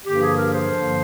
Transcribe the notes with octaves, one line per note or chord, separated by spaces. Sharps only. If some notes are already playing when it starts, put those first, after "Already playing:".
G2 D3 F3 A#3 G4
G#4
A#4
C5
G2 D3 F3 A#3